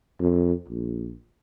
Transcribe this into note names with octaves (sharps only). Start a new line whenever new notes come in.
F2
A#1